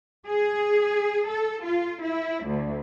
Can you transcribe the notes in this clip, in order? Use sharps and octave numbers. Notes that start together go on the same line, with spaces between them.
G#4
A4
F4
E4
D2